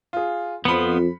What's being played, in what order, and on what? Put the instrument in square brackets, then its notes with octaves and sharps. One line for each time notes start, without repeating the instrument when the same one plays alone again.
[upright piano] F4 G#4
[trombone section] F2 [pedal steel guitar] F3 B3 [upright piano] B5 C#7